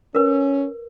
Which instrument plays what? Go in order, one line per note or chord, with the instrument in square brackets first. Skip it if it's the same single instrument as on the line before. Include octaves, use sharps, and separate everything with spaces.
[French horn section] C#4 [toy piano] A#4 B4